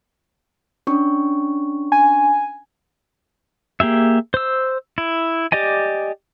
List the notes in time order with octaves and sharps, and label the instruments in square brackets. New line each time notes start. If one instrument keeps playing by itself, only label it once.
[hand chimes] C#4 D4 C#6
[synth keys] G#5
[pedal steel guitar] A#3 G4 G#4 E5
C5 E6
E4
G4 D5 D#5 G#5